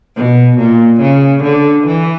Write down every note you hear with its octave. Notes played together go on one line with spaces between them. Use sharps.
B2
A#2
C#3
D3
E3